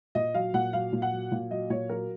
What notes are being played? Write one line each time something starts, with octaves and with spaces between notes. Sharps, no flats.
A#2 D#5
F#3 F5
A#2 F#5
F#3 F5
A#2
F#5
F#3
A#2
F#3 D#5
A#2 C#5
F#3 A#4